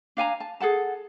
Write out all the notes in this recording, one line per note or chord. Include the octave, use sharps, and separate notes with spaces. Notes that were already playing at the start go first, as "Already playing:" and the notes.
D4 F5 G#5 A#5
A5
G#4 A4 F#5 A5